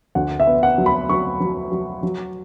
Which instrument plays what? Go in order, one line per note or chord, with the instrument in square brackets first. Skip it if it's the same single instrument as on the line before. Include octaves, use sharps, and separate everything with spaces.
[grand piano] D2 F#5
E5
B3
F#5
F#3
B5
F#3 C#6
F#3
F#3
F#3